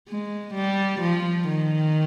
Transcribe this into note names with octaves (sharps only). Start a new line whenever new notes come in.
G#3
G3
F3
D#3